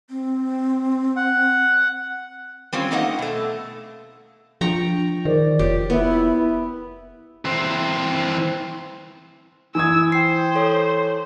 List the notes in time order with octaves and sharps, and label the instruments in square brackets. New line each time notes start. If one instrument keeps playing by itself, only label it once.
[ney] C4
[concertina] F#5
[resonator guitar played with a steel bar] G3 C4 C#4 F4
A3 A#3 D#4 D#5 F5 F#5
B2 A3
[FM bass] F3 [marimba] D4 F4 [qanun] G5 A#5 C#6
[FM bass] D#3 [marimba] G#4 A#4 C5 [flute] D5
[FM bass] F1 [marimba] F4 C#5 [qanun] G4
[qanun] B3 [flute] E4
[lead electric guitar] E3 C4
[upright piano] E3 D#6 G#6 [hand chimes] G#5 [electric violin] E6
[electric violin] C5 [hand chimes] G5 C7
[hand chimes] A4 C#5 C6